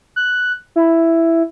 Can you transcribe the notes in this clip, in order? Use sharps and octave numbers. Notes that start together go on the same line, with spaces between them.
F#6
E4